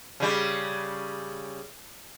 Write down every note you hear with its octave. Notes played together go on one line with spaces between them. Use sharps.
C#3 G3